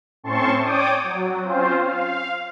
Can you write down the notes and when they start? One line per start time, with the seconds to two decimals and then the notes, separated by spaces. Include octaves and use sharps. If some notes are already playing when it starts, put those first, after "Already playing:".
0.24 A2 C4 C#4 A5 C6 C#6
0.62 C#5 D5 G5 D6 D#6
1.04 F#3
1.43 C4 C#4 F4 C5
1.77 F5